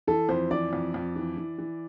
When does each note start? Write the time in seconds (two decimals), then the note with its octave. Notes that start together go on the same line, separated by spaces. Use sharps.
0.07 E3 A4
0.29 F2 C5
0.51 E3 D5
0.73 F2
0.94 F2
1.16 E3
1.37 E3
1.58 E3